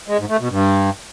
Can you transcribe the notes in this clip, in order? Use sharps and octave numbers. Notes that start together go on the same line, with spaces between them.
G#3
G#2
A3
B2
G2